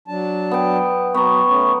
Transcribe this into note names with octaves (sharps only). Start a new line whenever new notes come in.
F#3 D4 A5
B3 G5
F#3 B3 A#5 C#6
A3 C#4